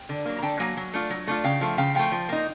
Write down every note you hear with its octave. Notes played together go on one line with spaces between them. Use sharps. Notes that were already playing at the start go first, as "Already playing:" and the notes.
Already playing: G5
D3
F#3 A#3
A#5
D3 G5 A5
F#3 A#3 G#5
F#3
A3 D4 F4
F#3
A3 D4 F4
C#3 F5 G5
F3 A3
C#3 F5 G5
F3 A3 F5 G5
F3
A#3 D#4